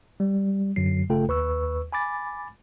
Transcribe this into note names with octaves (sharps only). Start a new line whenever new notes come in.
G3
F#2 D3 F#3 C7
G1 C#3 A3 F4 A4 G5
D#2 B4 C#6 E6
G#5 B5 D6 A6